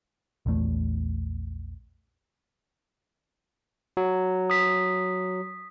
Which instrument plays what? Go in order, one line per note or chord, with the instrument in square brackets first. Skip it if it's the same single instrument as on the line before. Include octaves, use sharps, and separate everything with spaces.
[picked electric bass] A#1 E2 A3
[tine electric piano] F#3
[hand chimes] D#6 B6